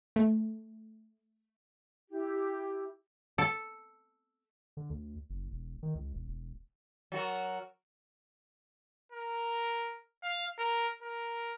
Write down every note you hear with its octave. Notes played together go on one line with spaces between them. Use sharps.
A3
E4 G4
A4
D3
D2
F#1
E1
D#3
C#2
E1
E1
F#3 F#4 A#4
A#4
F5
A#4
A#4